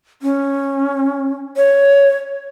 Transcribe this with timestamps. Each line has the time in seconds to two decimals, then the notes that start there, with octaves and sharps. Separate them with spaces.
0.22 C#4
1.57 C#5